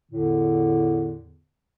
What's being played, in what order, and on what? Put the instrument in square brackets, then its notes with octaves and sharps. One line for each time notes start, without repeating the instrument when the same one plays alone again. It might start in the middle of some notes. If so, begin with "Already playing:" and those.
[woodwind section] E2 A2 D3